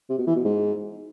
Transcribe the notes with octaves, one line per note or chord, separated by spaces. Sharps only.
C3
B2
E3
B2
G#2